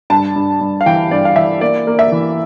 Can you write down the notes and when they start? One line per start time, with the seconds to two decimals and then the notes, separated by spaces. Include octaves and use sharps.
0.10 G2 A5
0.36 G2
0.61 G2
0.81 F5
0.86 E3 G5
1.11 G2 D5
1.25 F5
1.36 E3 E5
1.61 A#3 D5
1.87 A#3
1.99 E5
2.12 E3